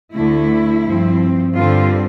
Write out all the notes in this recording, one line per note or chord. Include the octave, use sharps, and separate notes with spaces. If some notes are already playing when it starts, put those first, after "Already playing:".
D2 D3 A3 E4
G2 F3 C4
G2 D3 G3 C4 F4